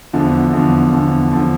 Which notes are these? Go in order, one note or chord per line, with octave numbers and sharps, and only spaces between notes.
E2 D3 F3
E2 D3 F3
E2 D3 F3
D3 F3